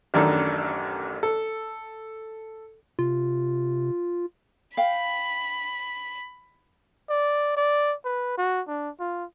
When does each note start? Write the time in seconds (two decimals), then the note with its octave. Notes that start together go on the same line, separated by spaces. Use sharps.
0.14 A1 F#2 D#3 D4 A4
1.23 A4
2.99 C3 F4
4.77 F5 G5 B5
7.09 D5
7.57 D5
8.05 B4
8.38 F#4
8.68 D4
9.00 F4